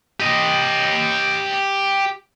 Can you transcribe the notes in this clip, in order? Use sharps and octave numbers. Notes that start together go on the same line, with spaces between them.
G4 D#5